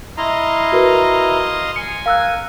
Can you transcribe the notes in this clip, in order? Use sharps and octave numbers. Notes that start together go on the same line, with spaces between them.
E4 D#5 F5 A#5 C6
F#4 A#4 B4
G#5 C#7
A#4 F5 E6 F#6